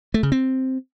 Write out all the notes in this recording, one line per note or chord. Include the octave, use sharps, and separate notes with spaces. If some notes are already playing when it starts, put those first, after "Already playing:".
A3
C#3
C4